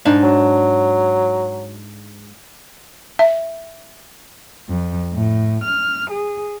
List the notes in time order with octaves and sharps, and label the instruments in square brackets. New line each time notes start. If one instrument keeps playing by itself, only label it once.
[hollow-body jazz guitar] G#2 D4 D#4
[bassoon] F#3
[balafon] E5
[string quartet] F2
A2
F6
G#4